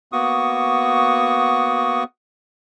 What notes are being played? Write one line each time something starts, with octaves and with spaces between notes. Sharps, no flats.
A#3 B3 F#4 C#6 D#6